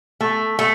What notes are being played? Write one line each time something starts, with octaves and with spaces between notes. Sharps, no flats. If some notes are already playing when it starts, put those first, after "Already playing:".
A3
A3